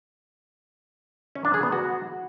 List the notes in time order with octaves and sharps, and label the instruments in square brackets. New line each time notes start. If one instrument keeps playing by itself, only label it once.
[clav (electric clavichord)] C#4
D4
G#4
B3
F#4